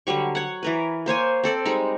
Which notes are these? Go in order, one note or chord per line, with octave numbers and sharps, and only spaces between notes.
D3 F#3 G3 C#6
C#5 F#5
E3 A#4 B4
A#3 C5 C#5 G#5
C4 A4 D5
G3 G#3 D#4